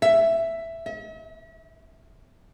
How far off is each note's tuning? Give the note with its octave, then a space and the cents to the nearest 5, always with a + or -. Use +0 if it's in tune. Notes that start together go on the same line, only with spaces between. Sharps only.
E5 +5
E5 -45